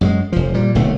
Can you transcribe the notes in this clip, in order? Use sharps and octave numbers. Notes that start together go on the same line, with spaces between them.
F#2 G3 G#3
F1 F3
A#2 G3
D1 B1 C#3 A3